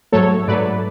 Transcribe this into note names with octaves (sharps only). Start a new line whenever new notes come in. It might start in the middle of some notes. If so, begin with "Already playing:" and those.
G#2 F#3 A3 A4 C#5
G#2 F#3 A3 B4 D5